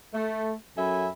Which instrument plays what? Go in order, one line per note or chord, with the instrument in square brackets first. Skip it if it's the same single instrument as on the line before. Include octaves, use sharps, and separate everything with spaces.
[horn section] A3
F#2 F#3 A4 E5 G#5 B5